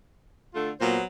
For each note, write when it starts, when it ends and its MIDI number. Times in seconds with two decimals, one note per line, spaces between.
0.55 0.71 50
0.55 0.71 57
0.55 0.71 65
0.81 0.98 46
0.81 1.03 54
0.81 1.03 59
0.81 1.03 72